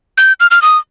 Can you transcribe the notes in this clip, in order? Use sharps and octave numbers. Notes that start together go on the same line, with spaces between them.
G6
F6
F6
D#6